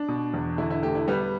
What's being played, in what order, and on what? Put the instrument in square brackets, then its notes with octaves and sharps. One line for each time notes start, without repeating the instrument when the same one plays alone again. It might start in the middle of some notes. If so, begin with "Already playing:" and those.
Already playing: [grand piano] D4
[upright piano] B2
E2
[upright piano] D3 [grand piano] E4
[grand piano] E4
[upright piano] A3 [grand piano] G4
[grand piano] E4
[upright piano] G3 [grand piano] B3